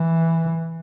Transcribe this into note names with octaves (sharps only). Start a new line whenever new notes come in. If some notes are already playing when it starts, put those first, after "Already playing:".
Already playing: E3